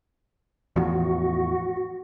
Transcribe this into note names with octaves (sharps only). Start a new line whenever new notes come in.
E2 A2 F3 F#4